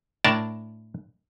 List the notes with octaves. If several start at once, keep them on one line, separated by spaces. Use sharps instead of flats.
A2 D4 A#4 D5 A5